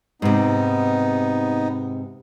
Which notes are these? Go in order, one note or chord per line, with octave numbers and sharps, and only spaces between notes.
G#2 C3 B3 D#4